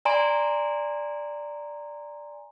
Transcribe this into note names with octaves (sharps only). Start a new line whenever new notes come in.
D5 G#5 A#5 C6 D7